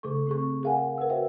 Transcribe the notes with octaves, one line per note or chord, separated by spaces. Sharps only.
C#3 A3 G#4 A4 C#6
C4 G#4 C#6
G#4 A#4 F5 F#5 G#5
A#4 B4 F#5 E6
F#4 C5 E5 F5 G5